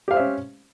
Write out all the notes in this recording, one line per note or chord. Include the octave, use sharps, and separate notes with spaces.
C#4 G4 C5 E5 F5